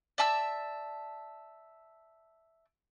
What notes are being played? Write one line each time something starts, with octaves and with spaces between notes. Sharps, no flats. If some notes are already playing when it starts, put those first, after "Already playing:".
D5 E5 A5 E6